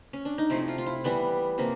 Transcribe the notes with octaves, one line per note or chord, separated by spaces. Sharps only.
C#4
D4
D#4
C3 F3 A3 E4
F4
F4
E4
E3 G3 B3
C3 F3 A#3